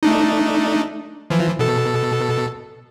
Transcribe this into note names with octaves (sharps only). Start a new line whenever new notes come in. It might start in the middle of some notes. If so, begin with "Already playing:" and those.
A3 D4 D#4
E3 F3
B2 A4